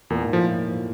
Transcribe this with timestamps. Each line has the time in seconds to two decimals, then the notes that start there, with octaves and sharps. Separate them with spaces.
0.10 E2 A#2
0.22 G#2
0.33 A2 F3